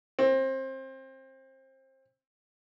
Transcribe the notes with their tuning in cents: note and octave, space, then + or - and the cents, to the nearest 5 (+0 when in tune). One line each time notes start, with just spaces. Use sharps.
C4 +25